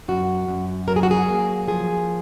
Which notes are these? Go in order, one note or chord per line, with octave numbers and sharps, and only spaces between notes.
F#2 F#4
F#2
F#3 A#4
G#4
F#4
G#4
A#3
F3 G#4